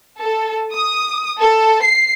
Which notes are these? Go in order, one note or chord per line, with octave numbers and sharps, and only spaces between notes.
A4
D#6
A4
C7